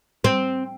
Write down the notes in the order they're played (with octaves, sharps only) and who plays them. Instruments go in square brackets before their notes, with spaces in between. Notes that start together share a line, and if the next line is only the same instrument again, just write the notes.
[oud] C4